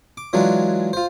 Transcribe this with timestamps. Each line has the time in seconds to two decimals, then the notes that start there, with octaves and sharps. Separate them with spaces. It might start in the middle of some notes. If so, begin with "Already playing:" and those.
0.17 D6
0.33 E3 F#3 G#3 D4 F4
0.93 F4 C5